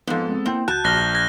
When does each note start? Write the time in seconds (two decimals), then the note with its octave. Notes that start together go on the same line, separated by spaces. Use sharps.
0.07 F2 G#2 B3 A4
0.29 G#3 C4
0.46 A#3 C4 E4 G5
0.68 C#2 F#4 A5 F#6 G6
0.84 A#1 F6 F#6 A#6 G7
1.15 F#6 G#6 A#6